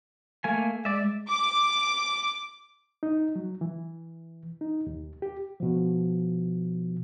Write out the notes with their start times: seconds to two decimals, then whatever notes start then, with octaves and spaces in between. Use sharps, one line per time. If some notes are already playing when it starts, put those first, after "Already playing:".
0.44 A3 A#3 G#5
0.85 G#3 D5 E5
1.27 D6
3.03 D#4
3.36 F#3
3.61 E3
4.61 D#4
4.87 D#2
5.22 G4
5.60 B2 F3